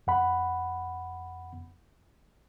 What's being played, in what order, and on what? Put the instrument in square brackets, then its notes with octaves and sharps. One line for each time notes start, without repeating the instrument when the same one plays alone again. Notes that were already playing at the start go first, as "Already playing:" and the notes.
[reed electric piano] F2 F#5 B5